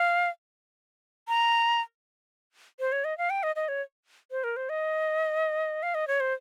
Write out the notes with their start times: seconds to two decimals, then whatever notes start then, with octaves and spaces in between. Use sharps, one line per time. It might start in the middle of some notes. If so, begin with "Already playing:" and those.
Already playing: F5
1.28 A#5
2.80 C5
2.92 C#5
3.04 D#5
3.18 F5
3.30 G5
3.43 D#5
3.56 D#5
3.68 C#5
4.31 C5
4.44 A#4
4.57 C5
4.69 D#5
5.83 F5
5.95 D#5
6.08 C#5
6.20 C5